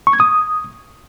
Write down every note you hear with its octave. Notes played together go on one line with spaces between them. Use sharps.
C#6
G#6
D#6